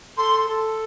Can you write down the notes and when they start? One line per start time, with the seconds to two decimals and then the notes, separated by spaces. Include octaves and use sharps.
0.17 A4 C6
0.48 A4